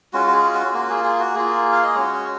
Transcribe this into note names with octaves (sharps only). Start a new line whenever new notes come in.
G#3 C#4 F4 F#4
F#4
G#4
F#4
A#3 F4 F#4
G#4
G#4
F#4
A#3 F4 G#4
F5
D#5
G#3 C#4 F#4 C#5